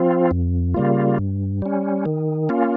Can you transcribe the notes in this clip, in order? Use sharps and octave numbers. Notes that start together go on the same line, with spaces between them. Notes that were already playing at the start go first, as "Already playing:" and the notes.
Already playing: F3 C4 F4
F2
C#3 G3 A#3 F4
G2
G3 C#4
D#3
A#3 C#4 F4